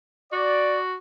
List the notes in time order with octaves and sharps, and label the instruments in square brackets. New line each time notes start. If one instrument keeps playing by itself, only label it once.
[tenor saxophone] F#4 [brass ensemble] D5